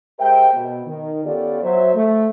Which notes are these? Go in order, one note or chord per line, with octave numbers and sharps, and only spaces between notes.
G#3 G4 A#4 C5 E5 G5
B2
D#3
B3 C#4 F4 G4 A4 D5
F#3 C5 E5
A3